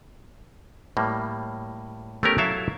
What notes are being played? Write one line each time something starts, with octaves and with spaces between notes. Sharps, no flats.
A2 G3 A#3
A3 B3 C#4 G4 A#4
F#3 E4 A4 E5 F5